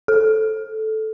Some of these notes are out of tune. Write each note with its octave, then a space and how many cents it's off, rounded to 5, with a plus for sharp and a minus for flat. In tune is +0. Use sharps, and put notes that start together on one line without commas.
A4 -10